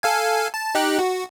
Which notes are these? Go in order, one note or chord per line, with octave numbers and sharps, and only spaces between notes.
A4 F5 G#5
A5
D#4 G4 F#6
F#4